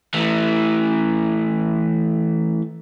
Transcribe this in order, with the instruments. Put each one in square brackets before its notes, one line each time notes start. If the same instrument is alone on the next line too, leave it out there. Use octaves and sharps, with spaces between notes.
[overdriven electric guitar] E3 A3